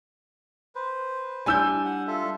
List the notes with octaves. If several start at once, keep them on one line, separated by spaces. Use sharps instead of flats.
B4 C5
G3 D4 E4 G#5 E6 G6
F#5
F4 A4 E5